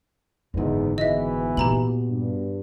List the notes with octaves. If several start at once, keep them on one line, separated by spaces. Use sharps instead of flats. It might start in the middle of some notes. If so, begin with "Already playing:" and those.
F#1 E2 G#2 D3
G#2 B2 E3 D#5 E5
A#2 G4 A#5 F#7
G2